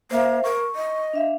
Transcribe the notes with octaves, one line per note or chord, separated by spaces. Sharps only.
A#3 C5 E5 F5
A#4 C#6
D#5
D4 E5 F5